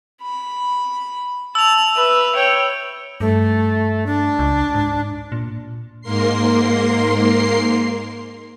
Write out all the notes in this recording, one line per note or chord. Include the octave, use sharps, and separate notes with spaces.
B5
A5 E6 F7
B4 E5
C#5 G5
G2 A3
D4
C#2
G#2
A#2
G#2 A#3 A#4 C6 C7